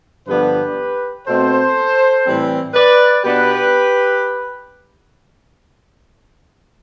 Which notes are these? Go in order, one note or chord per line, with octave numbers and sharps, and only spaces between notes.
G2 D3 F3 B3 D4 G4 B4
B2 A3 C4 A4 C5
A2 E3 G3 C4
B4 D5
B2 B3 D4 G4 B4